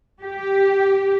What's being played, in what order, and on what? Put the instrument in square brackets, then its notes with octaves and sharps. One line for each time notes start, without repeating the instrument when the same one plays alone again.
[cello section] G4